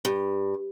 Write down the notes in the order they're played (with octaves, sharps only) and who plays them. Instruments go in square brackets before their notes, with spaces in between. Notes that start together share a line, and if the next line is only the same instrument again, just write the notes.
[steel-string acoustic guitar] G2